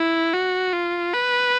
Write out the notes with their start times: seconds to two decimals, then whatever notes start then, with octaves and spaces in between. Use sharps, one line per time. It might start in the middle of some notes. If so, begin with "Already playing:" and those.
Already playing: E4
0.33 F#4
0.73 F4
1.14 B4